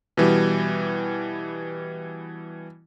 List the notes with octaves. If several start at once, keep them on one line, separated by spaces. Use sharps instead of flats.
B2 E3 G3